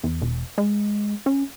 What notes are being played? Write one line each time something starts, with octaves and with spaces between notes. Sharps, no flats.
E2
E1
G#3
C#4